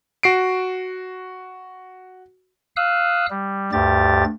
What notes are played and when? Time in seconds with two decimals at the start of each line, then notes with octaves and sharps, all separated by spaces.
0.23 F#4 C7 D7
2.76 F5 D#6 E6 F#6
3.30 G3
3.72 D2 G2 G4 A6